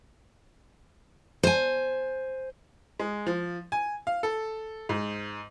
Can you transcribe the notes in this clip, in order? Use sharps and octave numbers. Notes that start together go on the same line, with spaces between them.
C5 G#5
G#3
F3
G#5
F5
A4
G#2